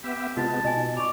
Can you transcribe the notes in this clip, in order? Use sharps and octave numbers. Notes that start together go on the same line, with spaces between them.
B3 G4 E5
C3 G#3 B3 F4 F#4 B4 A5
B2 D#5 G#5
D#4
D5 B5 C#6